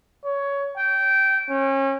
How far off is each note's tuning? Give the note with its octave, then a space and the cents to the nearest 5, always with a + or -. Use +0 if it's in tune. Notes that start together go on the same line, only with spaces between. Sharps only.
C#5 +15
G5 -15
C#4 -35